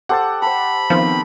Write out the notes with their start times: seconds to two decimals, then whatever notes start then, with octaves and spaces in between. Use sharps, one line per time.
0.09 G4 A4 C5 F#5 A6
0.42 A4 C5 B5
0.90 D#3 F3 B3 C4